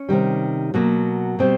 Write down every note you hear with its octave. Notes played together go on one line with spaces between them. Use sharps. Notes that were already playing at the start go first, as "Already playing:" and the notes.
Already playing: C#4
C3 D#3 G3
B2 F#3 A#3
B2 G3 C4